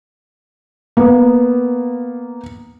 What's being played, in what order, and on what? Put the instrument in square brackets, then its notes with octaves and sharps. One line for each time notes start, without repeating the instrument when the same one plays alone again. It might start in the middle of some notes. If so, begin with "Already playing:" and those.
[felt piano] A#3 B3